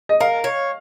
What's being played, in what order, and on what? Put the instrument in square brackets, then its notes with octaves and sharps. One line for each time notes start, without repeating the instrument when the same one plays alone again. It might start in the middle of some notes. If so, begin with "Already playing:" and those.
[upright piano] D#5
[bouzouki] A#4 [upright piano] F5
[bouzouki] C#5